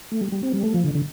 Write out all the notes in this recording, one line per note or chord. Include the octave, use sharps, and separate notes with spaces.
A3
G3
G3
C4
G3
A3
F3
D3
D3